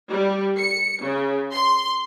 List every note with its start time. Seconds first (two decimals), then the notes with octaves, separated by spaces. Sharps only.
0.11 G3
0.58 C#7
1.03 C#3
1.53 C6